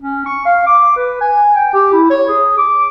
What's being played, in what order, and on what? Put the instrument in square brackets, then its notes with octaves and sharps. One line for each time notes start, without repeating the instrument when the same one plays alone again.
[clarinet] C#4
C#6
F5
D6
B4
G#5
G5
G4
E4
C#5
G#4
D6